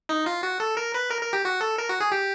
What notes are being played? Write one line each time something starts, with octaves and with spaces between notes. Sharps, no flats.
D#4
F4
F#4
A4
A#4
B4
A#4
A#4
G4
F#4
A4
A#4
F#4
G#4
G4